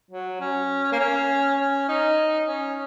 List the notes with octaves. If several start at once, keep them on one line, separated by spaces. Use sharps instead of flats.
F#3
C#4
A#3
C#4
C#4
D#4
C#4